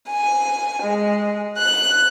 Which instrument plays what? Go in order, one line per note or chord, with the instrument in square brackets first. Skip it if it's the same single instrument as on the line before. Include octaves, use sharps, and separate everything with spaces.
[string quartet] G#5
G#3
F#6